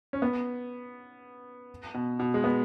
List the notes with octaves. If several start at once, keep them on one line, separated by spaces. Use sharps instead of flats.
C#4
B3
B2
B2
G#3
B3